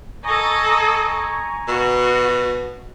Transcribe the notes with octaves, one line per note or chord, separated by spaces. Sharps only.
A4 D#5 G#5 A#5 C#6
B2 F#4